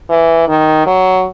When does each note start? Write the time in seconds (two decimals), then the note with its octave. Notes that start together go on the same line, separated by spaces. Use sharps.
0.09 E3
0.48 D#3
0.87 F#3